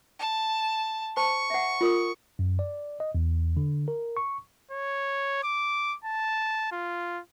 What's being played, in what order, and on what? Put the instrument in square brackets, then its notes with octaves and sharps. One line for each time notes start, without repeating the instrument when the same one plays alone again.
[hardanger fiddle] A5
[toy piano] C5 A5 [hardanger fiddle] C#6
[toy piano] E5 F#5
F4 A#4 D#6
[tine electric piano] F#2
D5
D#5
E2
D3
A#4
C#6
[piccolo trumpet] C#5
D6
A5
F4